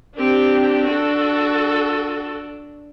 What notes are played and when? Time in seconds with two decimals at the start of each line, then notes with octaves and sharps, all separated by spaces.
0.17 C4 D4 G4
0.85 F#4 A4